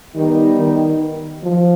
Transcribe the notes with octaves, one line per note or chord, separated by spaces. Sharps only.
D#3 G3 B3 D#4 G4
D#3
F3